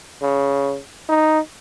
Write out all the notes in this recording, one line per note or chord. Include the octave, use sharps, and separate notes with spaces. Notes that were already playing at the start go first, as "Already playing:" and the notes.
C#3
D#4